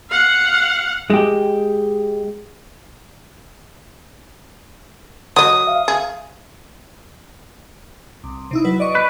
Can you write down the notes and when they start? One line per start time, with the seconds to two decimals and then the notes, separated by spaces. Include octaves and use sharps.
0.10 F5 F#5
1.10 G#3 G4
5.36 F#3 D#5 D#6
5.67 E5 F5
5.88 G#4
8.24 C2
8.51 C3 D#4 E4
8.64 F#3 B4
8.80 D5 D#5 C#6
8.95 B4